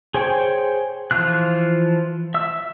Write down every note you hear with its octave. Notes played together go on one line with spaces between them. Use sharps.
G#4 C5 C#5 G5
E3 F3 F4 F#6
E5 E6